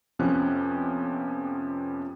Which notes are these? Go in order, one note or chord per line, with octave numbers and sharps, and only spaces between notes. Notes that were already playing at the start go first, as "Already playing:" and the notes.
F2 C3 F3 B3 C#4 F#6